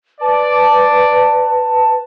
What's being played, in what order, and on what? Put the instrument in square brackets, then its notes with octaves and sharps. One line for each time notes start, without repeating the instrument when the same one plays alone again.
[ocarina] B4 [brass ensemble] D5 [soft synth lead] A5